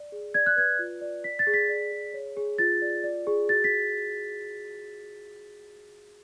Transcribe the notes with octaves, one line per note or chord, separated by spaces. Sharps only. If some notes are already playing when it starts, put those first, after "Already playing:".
Already playing: D5
G#4
D5 G#6
F#6
B4 G#6
F4
D5
D5 B6
A6
G#4
B6
D5
G#4
C#5
G#4
F4 A6
D5
D5
G#4
F#4 A6
B6